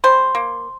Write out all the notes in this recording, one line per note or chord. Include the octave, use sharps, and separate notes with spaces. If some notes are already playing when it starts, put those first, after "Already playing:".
G3 C5
A#3